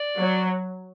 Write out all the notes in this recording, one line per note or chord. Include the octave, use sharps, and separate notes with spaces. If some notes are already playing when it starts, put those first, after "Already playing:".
Already playing: D5
F#3